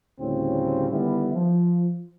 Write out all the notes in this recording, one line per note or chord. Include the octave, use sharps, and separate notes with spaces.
D2 A2 C#3 G3 C4
D3 D#3 G3 B3 E4
F3